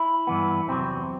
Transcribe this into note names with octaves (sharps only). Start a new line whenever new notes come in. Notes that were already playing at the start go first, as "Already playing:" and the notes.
Already playing: E4
G2 E3 B3
E2 C3 F#3 C4